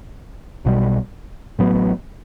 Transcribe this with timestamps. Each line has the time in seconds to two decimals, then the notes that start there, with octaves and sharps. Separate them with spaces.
0.65 B1 B2 G3
1.59 A1 A2 F#3 B3